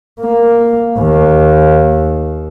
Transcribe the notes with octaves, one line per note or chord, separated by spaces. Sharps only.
A#3
D#2